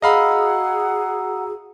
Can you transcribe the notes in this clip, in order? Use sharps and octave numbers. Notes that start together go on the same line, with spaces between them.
F#4 G#4 D#5 F5 F#5 A#5 B5 E6